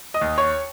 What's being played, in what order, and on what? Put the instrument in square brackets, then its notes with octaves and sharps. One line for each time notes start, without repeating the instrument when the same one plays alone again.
[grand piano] D#5 D#6
D#2
C#5 C#6